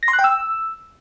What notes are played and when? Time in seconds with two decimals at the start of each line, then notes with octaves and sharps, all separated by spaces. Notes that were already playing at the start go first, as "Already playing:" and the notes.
0.03 A#6
0.08 C6
0.13 F#6
0.19 G5
0.24 E6